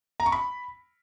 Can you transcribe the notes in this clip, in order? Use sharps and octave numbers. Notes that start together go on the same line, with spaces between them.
A#5
C#6
B5